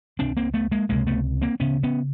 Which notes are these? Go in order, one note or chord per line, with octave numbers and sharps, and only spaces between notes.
C#2 C3 C4 D4
A#3 C4
A3 B3
G#3 A#3
C#2 C3 G#3 A#3
A3 B3
A#3 C4
D2 C#3 B3 C#4
B3 C#4